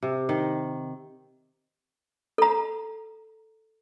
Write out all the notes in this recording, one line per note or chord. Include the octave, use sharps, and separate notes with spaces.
C3
D#3
A4 A#5